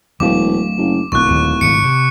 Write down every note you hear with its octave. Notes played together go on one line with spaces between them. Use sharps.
E1 F#3 A3 D4 D6
F#1
D1 B1 C#6 F#6
D#2 A#2
G#1 A#2 C#7 D7
C3